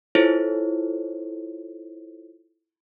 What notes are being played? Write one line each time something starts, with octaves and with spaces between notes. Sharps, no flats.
E4 F4 A4 C5 C#5